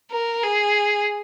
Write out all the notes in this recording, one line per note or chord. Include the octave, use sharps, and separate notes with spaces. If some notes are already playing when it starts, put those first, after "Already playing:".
A#4
G#4